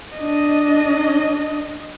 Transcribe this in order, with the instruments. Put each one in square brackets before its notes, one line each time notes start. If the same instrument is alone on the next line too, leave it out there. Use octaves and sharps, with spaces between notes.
[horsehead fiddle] D4 D#5